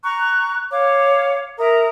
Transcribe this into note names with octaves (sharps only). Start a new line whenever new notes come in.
A#5 C#6 F#6
C#5 F5 D6
A#4 E5 A#5 D#6